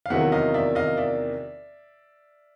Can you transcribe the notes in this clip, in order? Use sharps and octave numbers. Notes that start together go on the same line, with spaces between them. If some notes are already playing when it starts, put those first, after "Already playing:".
F5
E2 C3 D#3 F#3 A#3 E5 F#5
D#5 F5
D5 E5
D#5 F5
D5 E5